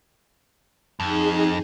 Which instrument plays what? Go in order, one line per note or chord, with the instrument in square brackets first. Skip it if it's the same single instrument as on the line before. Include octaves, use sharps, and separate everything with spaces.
[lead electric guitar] F2 [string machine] D#4 G#4